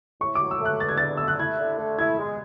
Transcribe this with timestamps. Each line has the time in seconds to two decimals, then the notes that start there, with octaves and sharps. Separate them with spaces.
0.21 A2 C#6
0.35 F#3 D6
0.51 E6
0.60 A3 F#6
0.80 E2 A6
0.89 G#6
0.98 D3 A6
1.17 A3 E6
1.28 F#6
1.39 E4 G#6
1.59 D3
1.78 A3
1.99 E4 G#6
2.19 G#3